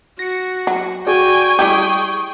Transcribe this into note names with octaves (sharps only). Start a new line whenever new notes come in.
F#4 A#6 C#7
F#3
F#4 G#4 D5 G5 G#5 C#6
G3 E4 G4 G#4 G5 D#6